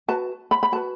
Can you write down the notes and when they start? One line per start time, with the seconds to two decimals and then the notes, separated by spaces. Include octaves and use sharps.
0.08 F#4 B4 A5
0.51 B5
0.63 B5
0.72 F#4 A5
0.75 B4